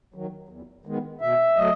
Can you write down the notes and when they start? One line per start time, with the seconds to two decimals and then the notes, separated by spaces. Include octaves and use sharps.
0.14 D#3 F#3
0.49 E2
0.86 D#3 G#3 B3
1.21 B2 E5
1.56 F#3 A3 D#5